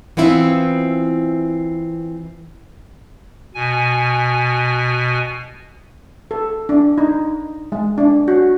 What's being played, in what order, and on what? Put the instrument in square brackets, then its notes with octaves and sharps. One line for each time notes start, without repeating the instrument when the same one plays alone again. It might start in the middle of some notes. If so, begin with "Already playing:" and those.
[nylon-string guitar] E3 B3 C4 E4 F4
[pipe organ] B2 G#5
[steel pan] A4
D4
D#4
G#3
D4
F#4